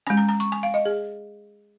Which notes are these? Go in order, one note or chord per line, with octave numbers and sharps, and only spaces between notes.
G#3 C#4 G#5
A#5
A#5
C#6
G#5
F5
D#5
G#4